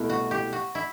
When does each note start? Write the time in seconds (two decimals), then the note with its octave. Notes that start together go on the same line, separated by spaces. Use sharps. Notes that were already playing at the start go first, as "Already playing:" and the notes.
Already playing: C2 B2 A3 E4
0.09 F#4
0.31 G4
0.53 F#4
0.75 E4